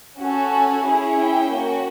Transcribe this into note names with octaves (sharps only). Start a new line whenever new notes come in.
C#4 F#4 A4
G#5
C#4 E4 G#4
G5
A#3 C#4 F#4